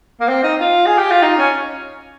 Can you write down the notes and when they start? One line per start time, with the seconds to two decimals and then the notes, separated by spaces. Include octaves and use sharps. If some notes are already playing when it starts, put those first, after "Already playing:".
0.20 A#3
0.28 C4
0.43 D#4
0.60 F4
0.86 G#4
0.98 G4
1.11 F4
1.22 D#4
1.38 C#4